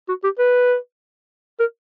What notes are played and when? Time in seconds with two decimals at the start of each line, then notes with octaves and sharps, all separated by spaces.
0.09 F#4
0.24 G4
0.39 B4
1.60 A#4